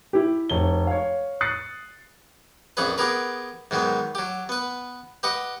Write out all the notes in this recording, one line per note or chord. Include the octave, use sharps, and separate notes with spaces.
E4 G4
F1 C#5 G7
C#5 F5
D#6 F#6 A6 C7 C#7
A#1 F2 C#4 G#4 B4
B3 G4 G#4 A#4 B4
G#2 D#3 F#3 B3
F#3 G4
B3 B4
G4 B4 D#5 F#5